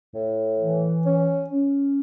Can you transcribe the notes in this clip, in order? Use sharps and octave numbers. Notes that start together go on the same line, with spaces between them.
A2
E3
C#4
C#4